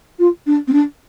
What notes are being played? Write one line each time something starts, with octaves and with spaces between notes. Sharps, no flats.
F4
D4
C4
D4